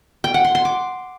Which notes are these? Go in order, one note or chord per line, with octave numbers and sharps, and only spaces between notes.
G5
F#5
C6
C6
D6